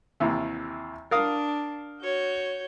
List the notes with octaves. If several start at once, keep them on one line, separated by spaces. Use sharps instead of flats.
D#2 C3 E3
D4 A#4 F5 D#6
F#4 C#5 G6